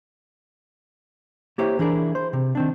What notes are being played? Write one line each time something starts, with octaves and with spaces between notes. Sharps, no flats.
A#3 E4 G4 C5 C#5
E3 D4 E4 G#4 A#4
C5
C3
D#3 C4 D4